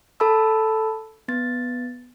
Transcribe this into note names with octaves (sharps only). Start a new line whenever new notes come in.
A4 A5 B5 E6
B3 A6